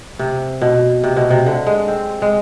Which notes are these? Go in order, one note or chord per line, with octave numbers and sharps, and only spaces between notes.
C3
B2
C3
B2
C3
D3
G#3
C4
G#3